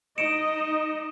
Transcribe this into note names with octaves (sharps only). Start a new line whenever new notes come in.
D#4 D#5 C#7 D7 E7